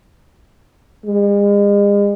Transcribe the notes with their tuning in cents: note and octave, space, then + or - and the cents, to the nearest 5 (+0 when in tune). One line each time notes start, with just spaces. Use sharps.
G#3 -40